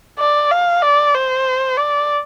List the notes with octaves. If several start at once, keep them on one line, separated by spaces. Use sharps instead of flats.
D5
F5
D5
C5
D5